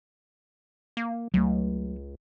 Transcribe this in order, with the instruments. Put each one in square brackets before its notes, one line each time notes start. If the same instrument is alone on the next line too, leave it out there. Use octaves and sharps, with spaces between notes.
[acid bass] A#3
[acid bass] C#2 [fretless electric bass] F#3 A3